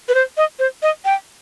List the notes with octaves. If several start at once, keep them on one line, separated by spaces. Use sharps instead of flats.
B4
C5
D#5
C5
D#5
G5